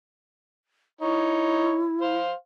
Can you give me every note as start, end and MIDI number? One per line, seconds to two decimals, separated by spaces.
1.01 1.82 63
1.01 2.16 64
1.01 1.82 73
2.01 2.33 72
2.01 2.33 77